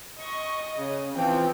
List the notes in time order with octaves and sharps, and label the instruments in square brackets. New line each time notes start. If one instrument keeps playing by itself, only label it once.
[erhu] D#5 [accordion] C#6
[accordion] C#3
[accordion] E3 F3 C4 [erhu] G5